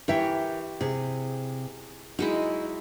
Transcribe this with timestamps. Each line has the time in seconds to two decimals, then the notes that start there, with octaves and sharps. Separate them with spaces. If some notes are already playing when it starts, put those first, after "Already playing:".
0.08 E3 G4 A#4 C#5 E5 G5
0.81 C3 G#4
2.19 F#3 G#3 D#4 E4